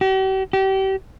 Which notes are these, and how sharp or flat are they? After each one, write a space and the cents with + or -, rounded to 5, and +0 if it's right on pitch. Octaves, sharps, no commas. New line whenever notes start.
G4 -45
G4 -30